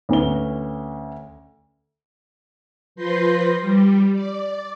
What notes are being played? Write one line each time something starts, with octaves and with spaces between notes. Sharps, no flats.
D2 C#4 B4 G7
F3 B4 C6 G6 A#6
G3
D5